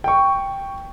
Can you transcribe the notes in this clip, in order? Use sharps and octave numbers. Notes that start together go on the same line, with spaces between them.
G5 C#6